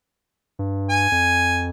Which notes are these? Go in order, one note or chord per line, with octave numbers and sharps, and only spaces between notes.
G2
G#5
F2